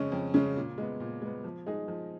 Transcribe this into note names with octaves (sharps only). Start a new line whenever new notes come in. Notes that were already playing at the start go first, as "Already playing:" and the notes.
Already playing: F2 C#3 G#3 C#4
F2
C#3 G#3 C#4
A#2
G#3 B3
A#2
G#3 B3
F3
G#3 D#4 G#4
F3